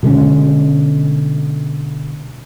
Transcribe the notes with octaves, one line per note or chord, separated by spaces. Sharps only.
B2 D3 G#3 C#4